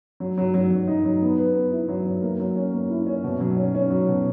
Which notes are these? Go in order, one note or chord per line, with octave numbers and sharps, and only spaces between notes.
F#3
F#3
F#3
F#3
D#4
F#3
B3
B4
B3
E4
F#3
F#3
A#3
F#3
C#4
A#3
E4
C#4
B2
F#3
C#4
C#4
F#3
B2